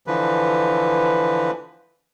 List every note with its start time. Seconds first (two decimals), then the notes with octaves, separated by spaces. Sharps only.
0.07 D3 E3 F3 B4